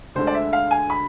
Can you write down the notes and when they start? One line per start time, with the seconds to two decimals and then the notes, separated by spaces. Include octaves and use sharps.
0.15 D2 D3 G#3 C5
0.27 D5
0.34 E5
0.53 F5
0.71 G#5
0.90 B5